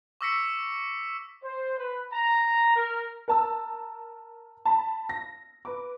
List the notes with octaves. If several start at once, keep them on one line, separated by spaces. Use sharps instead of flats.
C#6 D6 E6 A#6 B6 C#7
C5
B4
A#5
A#4
A#4 A5 E6
A5 B5
A#6
B4 D6